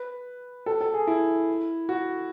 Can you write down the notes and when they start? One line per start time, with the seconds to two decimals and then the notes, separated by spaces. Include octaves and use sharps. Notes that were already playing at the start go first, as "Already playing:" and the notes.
Already playing: B4
0.66 A4
0.81 A4
0.94 G#4
1.07 E4
1.89 F#4